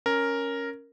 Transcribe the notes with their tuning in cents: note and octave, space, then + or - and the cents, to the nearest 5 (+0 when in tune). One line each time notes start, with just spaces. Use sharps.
C#4 +0 A#4 +0